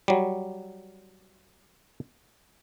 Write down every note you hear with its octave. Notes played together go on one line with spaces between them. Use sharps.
F#3 G3